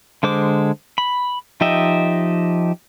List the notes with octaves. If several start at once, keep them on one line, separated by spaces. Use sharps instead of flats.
D3 G#3 C5 D6
B5
F3 D#4 G4 D#5 E5